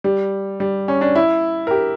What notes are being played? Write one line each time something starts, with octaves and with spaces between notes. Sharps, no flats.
G3
G3
C#4
D4
E4
A#4
G4